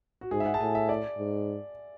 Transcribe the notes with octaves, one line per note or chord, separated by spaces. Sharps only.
F#4
G#2 G#4
E5
F#5
A5
A2 G#5
E5
D5
G#2